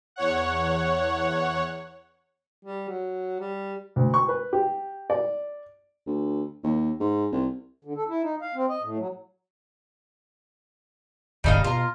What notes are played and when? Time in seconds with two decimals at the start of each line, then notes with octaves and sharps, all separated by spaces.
0.16 E2 C#5 F#5
2.65 G3
2.89 F#3
3.40 G3
3.96 D2
4.14 C#6
4.28 B4
4.53 G4
5.10 D5
6.07 D2
6.63 D#2
7.00 G#2
7.32 C2
7.85 D3
7.96 A4
8.09 E4
8.23 D#4
8.42 F5
8.55 C4
8.70 D#5
8.83 A2
8.99 F#3
11.44 D1 G1 C#3 G3 D#4 F5
11.64 B2 F4 A#5